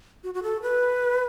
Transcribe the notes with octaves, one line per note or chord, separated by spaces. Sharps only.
F#4
F#4
A4
B4